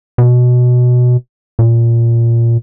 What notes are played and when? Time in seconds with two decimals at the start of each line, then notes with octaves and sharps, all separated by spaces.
0.18 B2
1.59 A#2